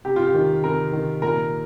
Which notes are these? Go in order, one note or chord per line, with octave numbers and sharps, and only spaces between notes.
C3 G4
F4
G4
D#3
C3 A#4
D#3
A#2 A#4